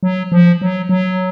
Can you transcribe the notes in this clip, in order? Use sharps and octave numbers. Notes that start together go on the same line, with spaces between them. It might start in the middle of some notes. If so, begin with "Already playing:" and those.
F#3
F3
F#3
F#3